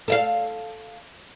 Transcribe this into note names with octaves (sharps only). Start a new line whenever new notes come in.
A4 E5 F5